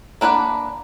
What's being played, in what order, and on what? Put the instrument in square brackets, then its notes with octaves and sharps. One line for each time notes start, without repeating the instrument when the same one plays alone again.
[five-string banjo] A#3 D4 B4 C5 F#5